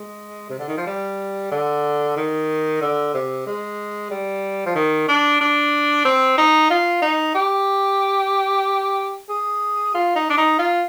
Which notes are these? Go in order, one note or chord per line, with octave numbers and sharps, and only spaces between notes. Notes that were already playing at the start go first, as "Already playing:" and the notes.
Already playing: G#3
C3
D3
D#3
F3
G3
D3
D#3
D3
C3
G#3
G3
F3
D#3
D4
D4
C4
D#4
F4
D#4
G4
G#4
F4
D#4
D4
D#4
F4